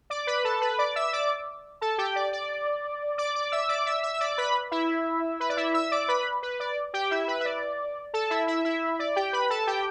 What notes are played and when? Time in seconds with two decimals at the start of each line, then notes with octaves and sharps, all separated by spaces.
0.10 D5 D6
0.27 B4 B5
0.44 A4 A5
0.61 B4 B5
0.78 D5 D6
0.96 E5 E6
1.13 D5 D6
1.81 A4 A5
1.98 G4 G5
2.16 D5
2.33 D5
3.18 D5 D6
3.35 D5 D6
3.52 E5 E6
3.69 D5 D6
3.86 E5 E6
4.03 E5 E6
4.14 E6
4.20 D5 D6
4.38 B4 B5
4.71 E4 E5
5.40 B4
5.49 D5
5.57 E4 E5
5.74 E5 E6
5.91 D5 D6
6.08 B4 B5
6.43 B4
6.60 D5
6.94 G4 G5
7.11 E4 E5
7.28 B4
7.40 E5
7.45 D5
8.14 A4 A5
8.30 E4 E5
8.47 E4 E5
8.65 E4 E5
8.99 D5
9.16 G4 G5
9.33 B4 B5
9.50 A4 A5
9.67 G4 G5